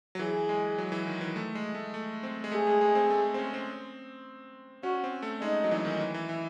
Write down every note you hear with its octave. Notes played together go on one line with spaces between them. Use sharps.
F#3
E3 G#4
G#3
F#3
E3
D#3
E3
A3
G#3
A3
A3
C4
G#3
A3 G#4
G#3
G#3
C4
A3
C4
C#4
C4
C#4 F#4
C4
A3
G#3 D#4
F#3
E3
D#3
E3
E3
E3